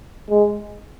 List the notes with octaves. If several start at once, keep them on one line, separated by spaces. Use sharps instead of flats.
G#3